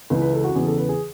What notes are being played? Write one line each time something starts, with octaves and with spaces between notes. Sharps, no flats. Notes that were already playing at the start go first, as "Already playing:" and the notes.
C#2 C#3 E3 B4
B4
A4
F#4
E2 C#3 E3 G#4
A4
B4
G#4